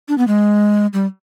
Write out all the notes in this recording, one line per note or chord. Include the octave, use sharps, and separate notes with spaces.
D4
B3
G#3
G3